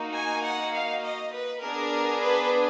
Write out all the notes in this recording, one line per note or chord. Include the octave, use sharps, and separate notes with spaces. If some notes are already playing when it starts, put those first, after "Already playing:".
Already playing: A#3 D#4 F#4
G#5
F#5
F5
D#5
B4
B3 D4 G#4 A#4
B4